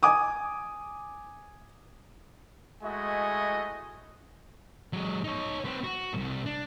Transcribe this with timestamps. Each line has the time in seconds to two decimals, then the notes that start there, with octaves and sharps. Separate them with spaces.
0.03 G#5 D6 D#6
2.83 G#3 A3 E4 F#4 D#5 G#5
4.93 F#3 G#3
5.24 D#4 C#5
5.65 C4 B4
5.84 F#4
6.13 C2 G#2
6.46 D4